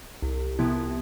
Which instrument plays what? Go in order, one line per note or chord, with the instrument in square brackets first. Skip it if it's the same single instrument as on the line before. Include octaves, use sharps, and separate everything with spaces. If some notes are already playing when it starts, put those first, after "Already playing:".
[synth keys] C2
C3 F3 B3 E4